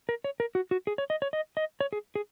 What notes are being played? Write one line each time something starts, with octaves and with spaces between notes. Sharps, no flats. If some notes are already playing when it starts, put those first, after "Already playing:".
A#4
C#5
A#4
F#4
F#4
G#4
C#5
D#5
C#5
D#5
D#5
C#5
G#4
G#4